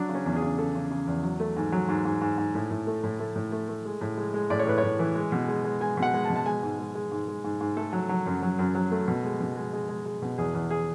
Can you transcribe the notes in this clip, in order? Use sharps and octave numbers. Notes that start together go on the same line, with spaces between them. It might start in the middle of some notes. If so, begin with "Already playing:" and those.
Already playing: F#3 D4
C#3
C#4
E2
G#4
C#3
C#3 A4
C#3
C#3
E2
F#3
A3
G#2
F#3
G#2
G#2
G#2
G#2
A2
A2
A3
A2
A3
A2
A3
A3
G#3
A2
G#3
G#3
A2 D5
C#5
A2 B4
C#5
A2
E3
G#3
B2
G#3
G#3
G#3 G#5
B2
F#5
G#3
A5
B2
A5
G#3 G#5
G#2
G#3
G#3
G#2
G#3
G#2
G#2
A3 A4
F#3
F#3
F#2
F#3
F#2
F#3
A3
B2
G#3
B2
G#3
G#3
G#3
G#3
B2
E2 G#4
E2
G#4